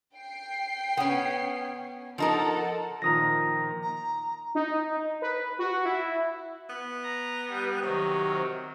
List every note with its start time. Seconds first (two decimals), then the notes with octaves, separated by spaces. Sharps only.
0.16 G5 C7
0.97 B3 C#4
2.18 F3 D#4 A4 A#4 F#5
3.02 A#2 D#3 F3 A#5 D#6 A#6
3.82 A#5
4.55 D#4
5.22 B4
5.59 F#4
5.85 E4
6.70 B3
7.03 A#5
7.48 G3
7.82 C3 D#3 F#3